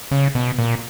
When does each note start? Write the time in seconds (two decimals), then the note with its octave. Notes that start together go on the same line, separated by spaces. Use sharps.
0.11 C#3
0.35 B2
0.58 A#2